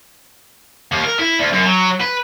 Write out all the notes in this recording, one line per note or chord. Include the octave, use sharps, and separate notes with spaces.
D#2
A#4
E4
D2
F#2
F#3
B4